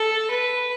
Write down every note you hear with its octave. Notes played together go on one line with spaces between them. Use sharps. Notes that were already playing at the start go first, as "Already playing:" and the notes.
Already playing: A4
B4